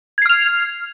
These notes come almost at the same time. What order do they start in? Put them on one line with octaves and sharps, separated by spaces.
G#6 C7 F6 F7